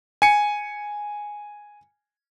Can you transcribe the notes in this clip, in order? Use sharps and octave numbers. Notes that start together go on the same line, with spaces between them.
G#5 C#7